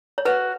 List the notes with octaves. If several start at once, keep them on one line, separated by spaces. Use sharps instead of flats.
C#5
F#4 B4